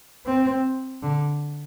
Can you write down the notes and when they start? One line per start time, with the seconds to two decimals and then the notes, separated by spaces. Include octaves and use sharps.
0.26 C4
1.03 D3